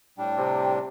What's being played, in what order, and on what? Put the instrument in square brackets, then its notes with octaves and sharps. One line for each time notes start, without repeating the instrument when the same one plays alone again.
[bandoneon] A2 G3 D4 [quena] G5
[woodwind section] C3